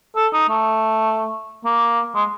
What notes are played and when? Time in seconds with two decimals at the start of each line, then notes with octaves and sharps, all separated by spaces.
0.16 A4
0.34 D#4
0.49 A3
1.65 A#3
2.15 G#3